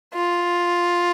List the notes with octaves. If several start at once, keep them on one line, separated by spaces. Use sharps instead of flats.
F4